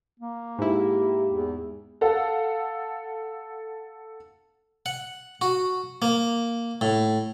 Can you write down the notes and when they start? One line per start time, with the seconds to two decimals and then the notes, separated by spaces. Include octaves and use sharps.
0.20 A#3
0.59 G#2 E4 G4
1.30 E2
2.01 A4 F5 F#5
4.86 F#5
5.41 F#4
6.02 A#3
6.81 A2